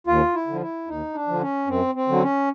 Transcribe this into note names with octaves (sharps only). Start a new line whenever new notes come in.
D#2 F4
E4
D3 F3
E4
D#2 D#4
D4
D3 F3
C#4
F#2 C4
C4
D3 F#3
C#4